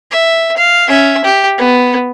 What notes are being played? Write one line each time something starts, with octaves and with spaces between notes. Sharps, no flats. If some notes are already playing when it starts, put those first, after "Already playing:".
E5
F5
C#4 E5
G4
B3